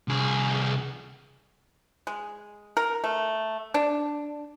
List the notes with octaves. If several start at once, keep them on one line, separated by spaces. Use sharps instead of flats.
C2 G#4
G#3
A#4
A3
D4